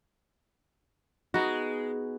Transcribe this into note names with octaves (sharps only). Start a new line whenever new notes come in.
G#3 B3 D#4 F#4